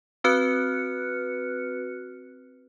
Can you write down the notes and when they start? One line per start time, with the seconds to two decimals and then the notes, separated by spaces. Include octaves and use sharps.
0.24 C4 F#4 B4 F6 F#6 C#7